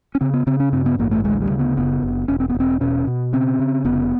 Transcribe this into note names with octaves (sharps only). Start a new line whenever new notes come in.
C#4
C#3 C4
B3
C#3 C4
C#4
G2 C4
B3
A1 A#3
A3
D2 G#3
G3
C#3
B3
F#1 B3
F#1
E1 C#4
C4
B3
E1
C4
B2 C#4
B2
C#3 C4
C#3
F1 B3